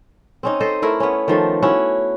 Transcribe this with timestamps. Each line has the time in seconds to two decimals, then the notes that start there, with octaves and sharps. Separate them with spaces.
0.43 C4 C#4 D#4
0.60 A4 C5 D#5
0.82 A3 E4 A#4
1.00 B3 C#4
1.28 D#3 F3 A3
1.62 C#4 E4 F#4